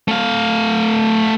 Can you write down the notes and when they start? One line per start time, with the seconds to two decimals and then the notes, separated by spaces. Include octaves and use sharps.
0.08 A3 F5